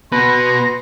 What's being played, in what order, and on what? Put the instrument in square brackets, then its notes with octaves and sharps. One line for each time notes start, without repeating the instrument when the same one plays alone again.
[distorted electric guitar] B2 [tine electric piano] B4 [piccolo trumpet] C6 [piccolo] A#6